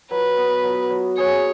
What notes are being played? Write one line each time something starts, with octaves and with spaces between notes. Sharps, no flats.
F#3 B4
B3
F#3
F#3
G#4 C#5